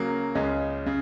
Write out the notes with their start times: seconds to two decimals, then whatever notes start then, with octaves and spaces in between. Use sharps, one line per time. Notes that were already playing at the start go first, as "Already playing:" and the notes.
Already playing: C#3 F#3 A#3
0.35 C#2 C#3 G#3 C#4
0.86 C#3